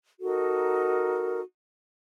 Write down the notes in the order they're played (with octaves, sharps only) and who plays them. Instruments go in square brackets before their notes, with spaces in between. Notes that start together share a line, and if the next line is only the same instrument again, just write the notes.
[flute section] D#4 F#4 A4 A#4